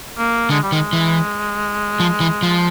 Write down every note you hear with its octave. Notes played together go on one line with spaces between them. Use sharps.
A#3
D3 G#3
G3
D#3 G#3
E3
F3
E3
F3